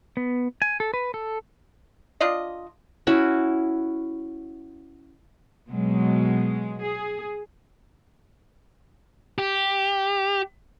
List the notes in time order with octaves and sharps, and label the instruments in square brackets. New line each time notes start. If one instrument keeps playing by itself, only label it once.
[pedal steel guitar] B3
G#5
A4
B4
A4
[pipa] D4 F4 D5 D#5
[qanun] C#4 E4 F#4
[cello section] B2 F#3 G#3
G#4
[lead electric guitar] G4